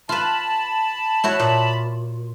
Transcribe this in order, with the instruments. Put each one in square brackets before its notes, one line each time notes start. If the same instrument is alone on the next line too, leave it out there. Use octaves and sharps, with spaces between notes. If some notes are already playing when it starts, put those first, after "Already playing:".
[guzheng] F4 B4 [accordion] A5 B5
[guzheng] E4 F#4 C#5
A#2